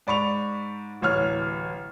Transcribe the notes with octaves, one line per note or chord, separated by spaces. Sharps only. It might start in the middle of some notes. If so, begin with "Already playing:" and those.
G#2 D5 B5 C#6 F7
D1 A1 C#5 F6